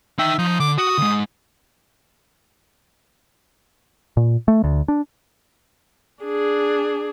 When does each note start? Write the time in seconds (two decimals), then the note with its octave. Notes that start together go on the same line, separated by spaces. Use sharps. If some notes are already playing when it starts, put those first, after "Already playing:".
0.19 D#4 E5 G5
0.38 F3 D#4
0.60 D3 D6
0.78 F#4 D#6
0.98 D2 G#2
4.17 A#2
4.48 A3
4.64 D2
4.88 D4
6.23 D4 G#4